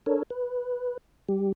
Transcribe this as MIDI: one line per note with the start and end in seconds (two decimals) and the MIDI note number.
0.06 0.23 62
0.06 0.23 69
0.06 0.23 70
0.06 0.23 73
0.30 0.97 71
1.29 1.52 55
1.29 1.52 67